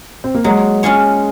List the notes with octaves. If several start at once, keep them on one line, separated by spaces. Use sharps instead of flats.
C4
A#3
F#3 G#3
C#4 F4 G#4 C#5